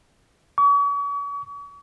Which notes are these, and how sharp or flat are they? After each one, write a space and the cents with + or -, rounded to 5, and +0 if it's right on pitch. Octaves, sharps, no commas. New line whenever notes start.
C#6 +40